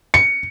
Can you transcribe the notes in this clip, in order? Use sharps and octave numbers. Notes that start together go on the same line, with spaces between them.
C#7